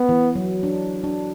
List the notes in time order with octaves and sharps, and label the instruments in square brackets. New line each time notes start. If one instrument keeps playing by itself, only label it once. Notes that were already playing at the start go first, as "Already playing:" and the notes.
Already playing: [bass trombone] B3
[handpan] E3
F#3
D4
D4